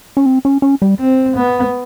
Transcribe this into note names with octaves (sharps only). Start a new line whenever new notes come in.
C#4
C4
C#4
C#4
G3
C4
B3